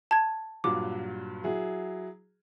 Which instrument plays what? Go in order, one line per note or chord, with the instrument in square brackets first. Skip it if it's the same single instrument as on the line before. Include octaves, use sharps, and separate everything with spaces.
[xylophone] A5 G#6
[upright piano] G2 A#2 F#3 [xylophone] D6
[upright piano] F#3 E4 G#4